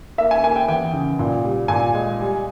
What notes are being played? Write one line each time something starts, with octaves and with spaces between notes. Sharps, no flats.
A#3 E5
G#5
A#3 G#5
G5
E2 G5
C#3
A#2
G3
A#2 G#5
G#3
G3